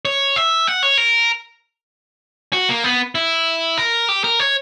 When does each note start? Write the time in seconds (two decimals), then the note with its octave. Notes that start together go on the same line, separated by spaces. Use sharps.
0.05 C#5
0.36 E5
0.67 F#5
0.83 C#5
0.98 A#4
2.53 F#4
2.69 A#3
2.84 B3
3.15 E4
3.78 A#4
4.09 G4
4.24 A#4
4.40 C#5